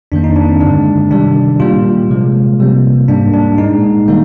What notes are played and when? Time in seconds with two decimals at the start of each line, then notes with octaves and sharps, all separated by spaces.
0.12 F2 D#3 A#3 D4
0.24 D#4
0.36 D4
0.49 C4
0.60 G2 D3 G#3 D4
1.11 C3 D#3 G3 D4
1.60 A#2 G3 A#3 F4
2.09 C3 F3 G#3
2.60 C3 G3 A#3
3.08 G#2 G3 A#3 D4
3.33 D4
3.58 A#2 G#3 D#4
4.08 D#3 G3 A#3 D#4